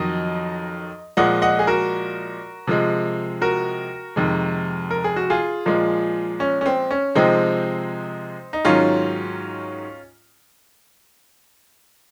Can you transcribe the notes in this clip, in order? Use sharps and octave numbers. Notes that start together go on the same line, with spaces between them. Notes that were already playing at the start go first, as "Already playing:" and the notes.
Already playing: F2 D#3 F#3 D#5
A#2 F3 G#3 D#5 F#5
D#5 F#5
G#4
F#4 A#4
C3 F3 G#3
F#4 A#4
F2 C3 D#3 G#3
A#4
G#4
F#4
F4 G#4
A#2 F3 G#3
C#4
C#4
C4
C#4
C3 F3 G#3 C4 D#4
D#4
G#2 D#3 F#3 C#4 F4